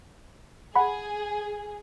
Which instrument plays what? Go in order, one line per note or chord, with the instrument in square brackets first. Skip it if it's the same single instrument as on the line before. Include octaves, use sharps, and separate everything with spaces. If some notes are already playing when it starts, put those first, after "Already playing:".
[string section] G#4 [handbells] F#5 B5